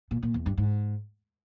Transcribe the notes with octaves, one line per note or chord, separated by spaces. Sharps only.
A#2
A#2
E2
G2
G#2